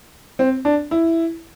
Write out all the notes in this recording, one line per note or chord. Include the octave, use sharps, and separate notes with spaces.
C4
D4
E4